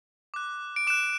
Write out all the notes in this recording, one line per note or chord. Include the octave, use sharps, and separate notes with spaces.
D6 F#6
D7
D6 F#6 E7